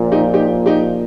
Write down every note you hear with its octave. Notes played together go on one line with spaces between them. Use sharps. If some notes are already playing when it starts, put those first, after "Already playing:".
Already playing: A#1 A#2 F3
D#4 G4
D#4 G4
D#4 G4